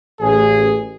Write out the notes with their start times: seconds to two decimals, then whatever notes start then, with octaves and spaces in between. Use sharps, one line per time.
0.20 A1 G#4